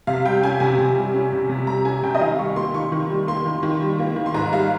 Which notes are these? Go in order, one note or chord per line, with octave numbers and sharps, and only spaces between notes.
C3 F5
G3 G5
C#4 G#5
C3 G#5
C3
G3
C#4
C3
C3
G3 A#5
C#4 G#5
C3 G5
D#5
D#3 F5
G3 C#6
A#3 C6
D#3 C#6
D#3
G3
A#3 C6
D#3
D#3
G3
A#3
D#3
C6
G#2 A#5
G3 F5